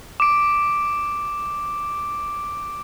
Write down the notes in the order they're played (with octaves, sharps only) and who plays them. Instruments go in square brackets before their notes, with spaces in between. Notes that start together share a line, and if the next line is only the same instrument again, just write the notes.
[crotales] D6 D7